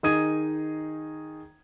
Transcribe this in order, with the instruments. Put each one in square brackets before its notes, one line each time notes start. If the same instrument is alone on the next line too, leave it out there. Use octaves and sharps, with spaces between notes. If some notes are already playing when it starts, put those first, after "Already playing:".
[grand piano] D#3 D#4 G#4 D#6 G#6 D#7